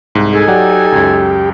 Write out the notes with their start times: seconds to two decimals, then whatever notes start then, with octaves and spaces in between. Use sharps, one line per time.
0.15 C2 G#2
0.33 D#4 G#4 A4 G#5
0.48 F#3 G4 D5 F#5
0.92 C#2 F#2